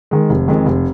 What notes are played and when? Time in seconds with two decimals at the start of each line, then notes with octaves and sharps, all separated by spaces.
0.11 D#3 G#3
0.30 F1
0.48 F2 D#3 G#3
0.66 F1